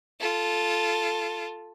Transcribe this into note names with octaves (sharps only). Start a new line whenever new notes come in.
F4 A4